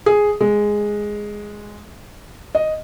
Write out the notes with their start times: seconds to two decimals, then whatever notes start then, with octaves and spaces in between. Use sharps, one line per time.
0.06 G#4
0.40 G#3
2.55 D#5